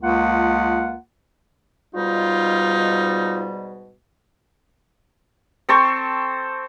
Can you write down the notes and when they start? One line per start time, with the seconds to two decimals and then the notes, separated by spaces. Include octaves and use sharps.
0.01 C#2 A#3 F4 F#5
1.95 G#2 B2 G3 D#4 F4
5.69 C4 A4 C5 C#6